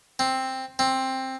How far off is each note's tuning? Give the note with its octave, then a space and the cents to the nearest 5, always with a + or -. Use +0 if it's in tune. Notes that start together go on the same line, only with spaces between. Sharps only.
C4 +5
C4 +10